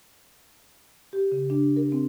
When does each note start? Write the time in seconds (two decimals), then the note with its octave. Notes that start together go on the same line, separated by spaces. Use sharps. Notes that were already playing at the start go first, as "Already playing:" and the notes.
1.13 G4
1.32 C#3
1.50 D4
1.76 A#4
1.92 C4